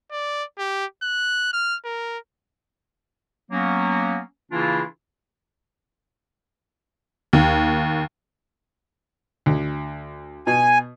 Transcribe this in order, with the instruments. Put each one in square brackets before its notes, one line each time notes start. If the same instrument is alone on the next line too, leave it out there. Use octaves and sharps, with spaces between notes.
[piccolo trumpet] D5
G4
F#6
F6
A#4
[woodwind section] F#3 A#3 B3 C#4
C#3 E3 A#3 D4 E4 F4
[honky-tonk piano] D#2
[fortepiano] D2
[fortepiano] B2 [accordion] G#5